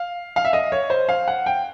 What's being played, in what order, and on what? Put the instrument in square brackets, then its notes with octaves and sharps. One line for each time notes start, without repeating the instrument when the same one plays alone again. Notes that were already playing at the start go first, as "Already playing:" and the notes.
Already playing: [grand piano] F5
F5
E5
D#5
C#5
C5
F5
F#5
G5